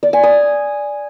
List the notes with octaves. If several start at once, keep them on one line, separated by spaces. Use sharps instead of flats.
D5
G#5
D#6